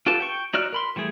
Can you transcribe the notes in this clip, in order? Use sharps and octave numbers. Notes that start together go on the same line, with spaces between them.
F4 G4 A4 B4 A5
G5 C#6
D#4 F#4 D5 F6 F#6
A#4 B5 C6
E3 G3 A3 G#4